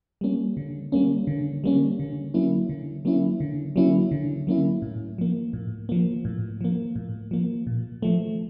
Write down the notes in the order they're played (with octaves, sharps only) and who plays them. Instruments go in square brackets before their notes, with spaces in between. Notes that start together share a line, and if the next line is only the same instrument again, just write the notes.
[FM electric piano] G3 A#3 C#4
D3
G3 A#3 C#4
D3
G3 A#3 C#4
D3
F#3 A#3 C#4 E4
D3
F#3 A#3 C#4 E4
D3
F#3 A#3 C#4 E4
D3
F#3 A#3 C#4 E4
A2
F3 A#3
A2
F3 A#3
A2
F3 A#3
A2
F3 A#3
A#2
F3 A3